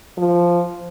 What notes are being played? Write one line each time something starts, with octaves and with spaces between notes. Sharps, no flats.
F3